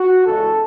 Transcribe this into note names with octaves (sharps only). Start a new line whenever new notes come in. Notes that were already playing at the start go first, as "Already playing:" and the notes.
Already playing: F#4
E2 C#3 G#3 A4